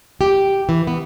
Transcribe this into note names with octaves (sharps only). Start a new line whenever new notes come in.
G4
E3
B3